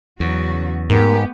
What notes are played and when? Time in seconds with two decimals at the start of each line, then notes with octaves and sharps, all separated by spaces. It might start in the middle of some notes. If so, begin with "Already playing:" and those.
0.20 E2 C#3 F#3 F#4
0.90 G#2 A3 B3 G4 A#4